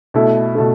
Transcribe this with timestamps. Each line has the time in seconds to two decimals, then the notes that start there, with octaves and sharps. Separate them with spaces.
0.14 B2 A3 E4 A4
0.55 B2 A3 E4 A4